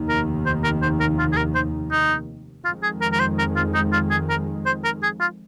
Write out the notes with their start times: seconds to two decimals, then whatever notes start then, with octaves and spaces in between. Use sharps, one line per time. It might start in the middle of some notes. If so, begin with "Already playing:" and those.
Already playing: F1 D#2 D#3
0.09 A#4
0.46 C5
0.64 A#4
0.82 C5
1.00 A#4
1.19 F4
1.32 G#4
1.37 A#4
1.55 C5
1.92 D#4
2.65 F2 D#3 G#3 F4
2.83 G#4
3.01 A#4
3.12 A#4
3.20 C5
3.38 A#4
3.56 F4
3.74 D#4
3.93 F4
4.11 G#4
4.29 A#4
4.66 C5
4.84 A#4
5.03 G#4
5.20 F4